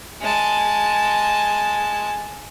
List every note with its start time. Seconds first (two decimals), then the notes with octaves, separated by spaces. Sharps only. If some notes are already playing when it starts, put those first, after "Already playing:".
0.21 G#3 A5